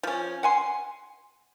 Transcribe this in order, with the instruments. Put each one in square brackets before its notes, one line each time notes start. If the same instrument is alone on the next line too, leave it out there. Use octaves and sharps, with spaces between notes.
[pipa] F3 C#4
F#5 G#5 C6